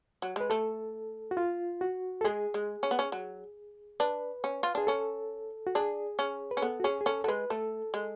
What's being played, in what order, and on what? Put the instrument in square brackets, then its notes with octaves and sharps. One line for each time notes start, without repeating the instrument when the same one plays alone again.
[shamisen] F#3
[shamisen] G#3 [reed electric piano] B4
[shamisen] A3 [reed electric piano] A4
[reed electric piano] F#4
F4
F#4
A4
[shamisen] G#3 [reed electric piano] G#4
[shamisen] G#3
C#4
B3
C#4
F#3
[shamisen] D4 [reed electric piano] B4
[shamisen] C#4
F4
[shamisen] D4 [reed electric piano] G#4
[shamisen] C#4 [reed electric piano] A4
[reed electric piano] F#4
[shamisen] D4 [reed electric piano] G#4
[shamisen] C#4
[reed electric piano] B4
[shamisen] C#4
[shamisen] B3 [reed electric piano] A4
[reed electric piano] F#4
[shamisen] C#4 [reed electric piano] G#4
[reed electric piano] G#4
[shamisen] C#4 [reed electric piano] A4
[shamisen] F#3 [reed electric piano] A4
[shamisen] G#3 [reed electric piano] B4
[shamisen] A3 [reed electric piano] A4
[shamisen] G#3